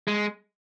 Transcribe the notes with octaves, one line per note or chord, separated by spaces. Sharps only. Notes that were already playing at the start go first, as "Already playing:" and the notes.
G#3